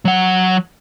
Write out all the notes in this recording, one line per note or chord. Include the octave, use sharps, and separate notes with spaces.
F#3 F#5